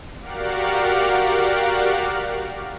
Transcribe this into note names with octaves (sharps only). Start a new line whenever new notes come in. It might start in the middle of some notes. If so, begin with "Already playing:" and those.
F#4 G4 A#4 D5 F5 F#5